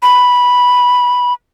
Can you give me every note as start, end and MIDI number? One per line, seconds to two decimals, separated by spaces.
0.02 1.33 83